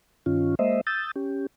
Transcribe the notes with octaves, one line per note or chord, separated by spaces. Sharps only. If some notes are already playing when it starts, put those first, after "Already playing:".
G2 D#3 C#4 F4
G#3 A#3 C5 D#5 E5
D#6 E6 G6 A6
C#4 G4